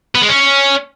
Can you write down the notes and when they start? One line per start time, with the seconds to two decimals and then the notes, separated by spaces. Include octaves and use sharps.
0.15 B3
0.22 G#3
0.29 C#4